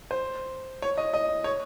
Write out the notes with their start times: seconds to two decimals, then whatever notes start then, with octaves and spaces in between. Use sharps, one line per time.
0.11 C5
0.82 C#5
0.98 D#5
1.14 D#5
1.44 C#5